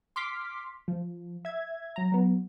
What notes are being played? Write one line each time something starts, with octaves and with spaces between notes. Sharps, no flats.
C6 D6 F6 B6
F3
E5 G#6
F#3 A#5
F#3 B3